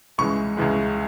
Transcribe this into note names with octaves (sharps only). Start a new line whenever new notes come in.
C#2 C#3 E3 G#3 C#6
C#2 C#3 E3 G#3